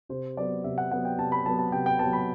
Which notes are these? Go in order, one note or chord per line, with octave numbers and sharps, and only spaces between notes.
C3 C5
F#3 B3 D5
C3 E5
F#5
F#3 B3 F#5
G5
C3 A5
B5
F#3 B3 A5
A5
C3 G5
G5
F#3 B3 A5
B5